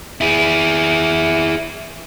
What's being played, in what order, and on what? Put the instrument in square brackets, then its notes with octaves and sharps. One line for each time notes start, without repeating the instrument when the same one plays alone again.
[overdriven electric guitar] E4 G#4